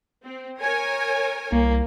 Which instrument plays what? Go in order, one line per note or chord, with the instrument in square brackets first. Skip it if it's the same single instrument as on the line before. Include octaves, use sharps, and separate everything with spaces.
[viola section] C4
A#4 C#5 G#5
[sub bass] C2 [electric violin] A#3